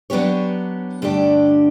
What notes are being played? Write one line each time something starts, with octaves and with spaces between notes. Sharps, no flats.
F#3 B3 D4 G4 C#5
G2 D3 A3 D4 G4